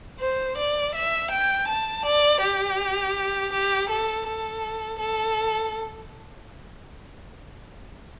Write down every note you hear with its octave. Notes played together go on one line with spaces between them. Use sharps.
C5
D5
E5
G5
A5
D5
G4
G4
A4
A4
A4